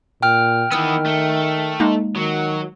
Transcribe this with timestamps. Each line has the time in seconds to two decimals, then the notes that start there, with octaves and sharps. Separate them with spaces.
0.22 A#2 G5 F6
0.72 D#3 E3 B3 D#6 E6
1.05 A3
1.80 G#3 A#3 D#4
2.16 D#3 F#3